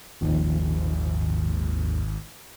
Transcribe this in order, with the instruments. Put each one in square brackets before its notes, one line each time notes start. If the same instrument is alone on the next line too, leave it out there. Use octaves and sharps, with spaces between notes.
[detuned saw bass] G#1 [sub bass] D#2 [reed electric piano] A#2 D#3 F3